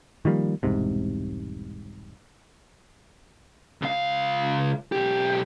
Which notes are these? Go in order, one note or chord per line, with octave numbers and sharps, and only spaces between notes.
D#3 F3 G3 A#3
E1 C2 G#2 C3
C#2 F5
B1 G4